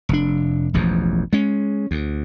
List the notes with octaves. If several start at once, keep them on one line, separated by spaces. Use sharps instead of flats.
F1 D4
E1 A1 E2 F3
G#3 C#4
D2